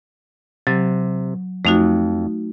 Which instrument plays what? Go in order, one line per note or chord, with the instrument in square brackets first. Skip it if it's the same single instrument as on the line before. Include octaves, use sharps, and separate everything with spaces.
[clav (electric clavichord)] C3 [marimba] F#3
[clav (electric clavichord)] F2 [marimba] A3 D#4 F#4